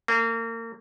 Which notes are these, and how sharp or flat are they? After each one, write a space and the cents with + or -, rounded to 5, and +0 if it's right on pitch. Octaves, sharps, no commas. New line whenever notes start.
A#3 -35